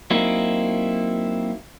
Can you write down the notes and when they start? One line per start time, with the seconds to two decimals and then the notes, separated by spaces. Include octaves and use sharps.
0.11 F#3 A#3 C4 D#4 E4